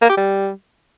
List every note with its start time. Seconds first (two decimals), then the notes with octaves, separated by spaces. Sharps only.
0.02 A#3
0.09 G4
0.17 G3